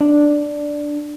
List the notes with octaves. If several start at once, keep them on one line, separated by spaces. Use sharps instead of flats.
D4